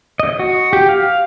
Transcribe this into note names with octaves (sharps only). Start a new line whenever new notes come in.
D#5
F#4
G4
F5